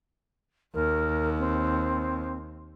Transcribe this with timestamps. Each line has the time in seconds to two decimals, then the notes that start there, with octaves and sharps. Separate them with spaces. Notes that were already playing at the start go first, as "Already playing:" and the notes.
0.74 D#2 A#4
1.39 C4